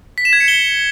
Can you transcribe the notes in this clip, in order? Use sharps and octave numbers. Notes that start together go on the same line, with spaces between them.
B6
E7
G#6
C#7
G7